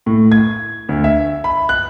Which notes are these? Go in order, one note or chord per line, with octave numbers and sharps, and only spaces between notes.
A2
G#6
D2
E5
B5
F#6